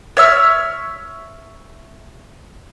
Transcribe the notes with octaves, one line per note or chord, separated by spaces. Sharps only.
C#5 E5 E6 F6